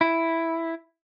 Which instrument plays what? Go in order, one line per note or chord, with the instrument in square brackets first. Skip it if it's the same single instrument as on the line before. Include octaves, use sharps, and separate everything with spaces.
[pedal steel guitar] E4